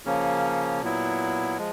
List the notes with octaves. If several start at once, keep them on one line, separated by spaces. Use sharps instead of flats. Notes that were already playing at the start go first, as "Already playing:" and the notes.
C#3 F3 A#3 C#4
A#2 F#3 B3 E4
F3 G#3